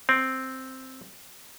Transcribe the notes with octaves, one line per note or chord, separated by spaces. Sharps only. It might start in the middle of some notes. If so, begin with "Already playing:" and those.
C4